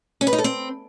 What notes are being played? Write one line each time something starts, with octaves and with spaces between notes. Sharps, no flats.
C#4
B4
D#4
A4
C4